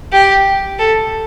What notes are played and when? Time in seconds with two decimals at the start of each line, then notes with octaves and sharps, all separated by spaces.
0.13 G4
0.79 A4